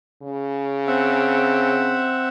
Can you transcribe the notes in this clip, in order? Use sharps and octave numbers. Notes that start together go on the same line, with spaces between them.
C#3
C4 E5 F#5